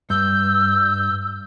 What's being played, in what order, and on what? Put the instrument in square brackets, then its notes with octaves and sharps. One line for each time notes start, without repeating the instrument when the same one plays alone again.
[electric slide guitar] G2 [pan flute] E6 [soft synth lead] G6